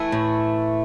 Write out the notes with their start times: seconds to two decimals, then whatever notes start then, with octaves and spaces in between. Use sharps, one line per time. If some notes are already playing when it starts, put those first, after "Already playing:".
Already playing: E3 A3 E4
0.12 A2